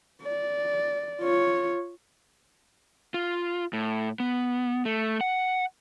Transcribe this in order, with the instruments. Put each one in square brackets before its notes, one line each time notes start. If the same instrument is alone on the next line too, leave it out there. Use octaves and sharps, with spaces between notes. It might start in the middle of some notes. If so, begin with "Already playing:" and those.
[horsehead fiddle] D5
F4 C#5
[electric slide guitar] F4
A2
B3
A3
F#5